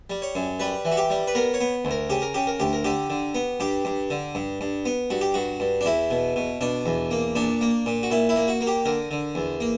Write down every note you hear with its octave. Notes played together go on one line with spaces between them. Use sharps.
G3
C#5
F#2
G3 B4
E3
F#4
G4
G3
B4
B3 A#4
C#5
B3
D2
A#4
C#3 G4
A#4
C#3 G4
A#4
D2 G4
A#4
D3 G4
D3
B3
G2 G4
G2
D3
G2
G2
B3
G2 F#4
G4
G2 F#4
G2
D4
E2 E4
B2
B2
B2 D4
E2
A#3
A#2 D4
A#3
A#2
F#4
A#2 E4
E4
A#3
F#4
A#3
G4
D3 A#4
D3
E2
A#3